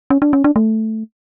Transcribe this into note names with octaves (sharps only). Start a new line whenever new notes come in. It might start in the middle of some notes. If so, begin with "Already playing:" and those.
C#4
D4
C#4
D4
A3